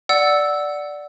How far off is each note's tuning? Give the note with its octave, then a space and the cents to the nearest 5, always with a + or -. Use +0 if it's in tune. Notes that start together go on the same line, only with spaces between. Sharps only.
D5 +0 F#5 +0 E6 -5